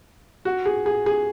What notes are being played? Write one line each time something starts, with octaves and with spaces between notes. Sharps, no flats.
F#4
G#4
G#4
G#4